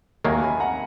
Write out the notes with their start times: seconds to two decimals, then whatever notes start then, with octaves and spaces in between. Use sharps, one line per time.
0.25 D#2 D#3 F#3 A#3 E5 G#5
0.42 G#5 B5
0.60 F#5 A#5